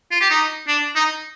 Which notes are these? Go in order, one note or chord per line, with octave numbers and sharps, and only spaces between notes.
F4
G4
D#4
D4
D#4